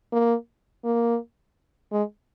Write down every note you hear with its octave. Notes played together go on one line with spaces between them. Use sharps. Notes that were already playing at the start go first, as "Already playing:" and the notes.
A#3
A#3
G#3